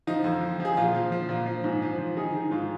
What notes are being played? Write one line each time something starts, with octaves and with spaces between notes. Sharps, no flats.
F3 D#4
F2
F3
F3
G#4
A#2 F4
F3
F3
A#2
F3
G#2
F3
F3
D#3 D#4 G#4
D#3
G#2 F4